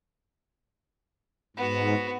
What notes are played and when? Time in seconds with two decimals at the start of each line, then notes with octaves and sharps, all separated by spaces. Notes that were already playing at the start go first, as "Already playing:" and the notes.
1.57 G#2 B3 F#4